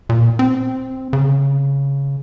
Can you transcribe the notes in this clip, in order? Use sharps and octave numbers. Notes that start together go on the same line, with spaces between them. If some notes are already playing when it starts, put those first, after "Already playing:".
A#2
C4
C#3